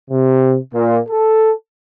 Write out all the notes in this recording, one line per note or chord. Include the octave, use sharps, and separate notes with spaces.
C3
A#2
A4